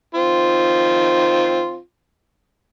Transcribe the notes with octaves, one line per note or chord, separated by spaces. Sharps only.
D#3 C4 F4